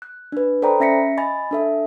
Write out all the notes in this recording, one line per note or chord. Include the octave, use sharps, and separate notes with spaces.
F#6
D4 B4
A4 C5 D5 G5 A#5 B5
C#4 E5 A#6 B6 C#7
D#5 G#5 B5 A6
D4 A4 E5